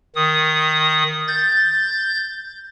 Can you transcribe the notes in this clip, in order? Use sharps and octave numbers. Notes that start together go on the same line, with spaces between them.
D#3 D#6
G6 A6